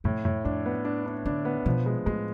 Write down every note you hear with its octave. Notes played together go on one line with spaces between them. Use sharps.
F2 A2
A2
F2 D4
B3
D4
D4
D3 D4
B3
B2 F3
G#3
A2 G#3